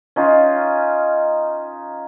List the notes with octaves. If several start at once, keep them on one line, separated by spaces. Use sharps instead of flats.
C#4 D#4 F4